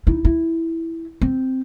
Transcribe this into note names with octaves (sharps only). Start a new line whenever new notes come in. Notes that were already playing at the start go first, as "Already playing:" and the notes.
D#4 E4
E4
C4